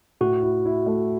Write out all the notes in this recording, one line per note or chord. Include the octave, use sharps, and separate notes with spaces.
A2 F#4
E4
E4
A3